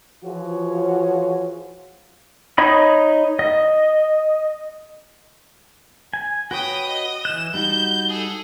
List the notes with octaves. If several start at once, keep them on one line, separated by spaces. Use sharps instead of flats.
E3 F3 F4 F#4 G#4 C#5
D#4 C#5 D#5 B5
D#5
G#5
F#4 B4 C#5 G5 D#6
D#5
E3 F#6 E7
G3 D#4 F#4 G6
G#4 A4